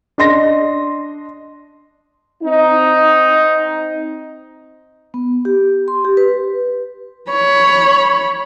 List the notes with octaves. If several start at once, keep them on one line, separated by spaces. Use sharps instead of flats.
D4 D#5 C6 A#6
C4 D#4
B3
G4
C6
G4
B4
C#5 B5